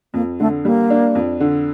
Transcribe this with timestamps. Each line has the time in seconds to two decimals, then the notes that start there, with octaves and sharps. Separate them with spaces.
0.14 F2 A#3
0.40 D3 A3
0.65 G3 A#3
0.90 D4
1.15 F2
1.40 D3